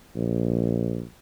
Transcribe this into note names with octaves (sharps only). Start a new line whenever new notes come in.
A#1